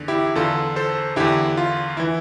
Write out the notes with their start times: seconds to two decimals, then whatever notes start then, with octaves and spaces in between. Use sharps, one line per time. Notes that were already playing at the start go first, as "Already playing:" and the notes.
Already playing: E2 D3
0.08 E4 G4
0.35 E2 D3 F4 A4
0.76 A4 C5
1.16 E2 D3 E4 G4
1.57 F4
1.97 E3 E4